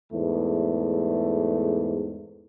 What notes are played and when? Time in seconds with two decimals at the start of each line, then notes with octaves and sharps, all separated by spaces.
0.12 E2 G#2 A3